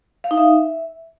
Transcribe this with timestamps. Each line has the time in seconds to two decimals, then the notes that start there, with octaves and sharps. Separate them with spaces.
0.24 F5
0.31 D#4
0.38 E5